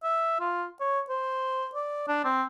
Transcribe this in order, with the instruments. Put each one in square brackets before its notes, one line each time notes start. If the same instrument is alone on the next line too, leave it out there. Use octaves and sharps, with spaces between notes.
[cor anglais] E5
F4
C#5
C5
D5
D4
C4